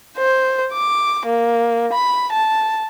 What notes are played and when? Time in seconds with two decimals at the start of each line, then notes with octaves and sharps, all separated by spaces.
0.18 C5
0.74 D6
1.26 A#3
1.92 B5
2.32 A5